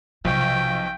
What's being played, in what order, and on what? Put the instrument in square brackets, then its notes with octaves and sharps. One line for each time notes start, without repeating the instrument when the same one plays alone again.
[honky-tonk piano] B1 [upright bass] C3 [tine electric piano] F3 C#6 [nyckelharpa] G5